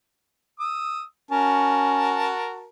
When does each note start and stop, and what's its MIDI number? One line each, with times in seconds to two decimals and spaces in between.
0.60 1.03 87
0.60 1.03 88
1.31 2.35 61
1.31 2.69 66
1.31 2.69 70
1.31 2.69 81